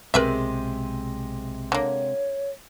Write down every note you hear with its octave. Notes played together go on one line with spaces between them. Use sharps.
B1 C3 G#3 C4 A#4 B4 E5
D3 A#3 C#5